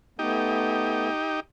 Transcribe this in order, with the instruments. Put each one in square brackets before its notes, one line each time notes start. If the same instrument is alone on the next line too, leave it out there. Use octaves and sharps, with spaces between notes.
[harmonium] A3 B3 [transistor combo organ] D#4 G4